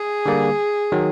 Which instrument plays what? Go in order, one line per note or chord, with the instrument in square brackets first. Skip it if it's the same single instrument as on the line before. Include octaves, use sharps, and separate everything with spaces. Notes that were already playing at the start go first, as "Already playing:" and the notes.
Already playing: [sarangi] G#4
[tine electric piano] D3 G3 A#3
D#3 F#3